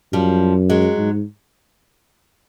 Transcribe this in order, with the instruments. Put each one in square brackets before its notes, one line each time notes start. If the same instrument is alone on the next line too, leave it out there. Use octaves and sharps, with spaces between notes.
[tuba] F#2 [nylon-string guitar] F3 G3
[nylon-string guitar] F#3 G#3
[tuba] G#2